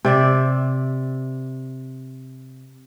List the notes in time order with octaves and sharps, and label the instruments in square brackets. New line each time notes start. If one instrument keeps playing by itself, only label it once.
[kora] C3 D5 E5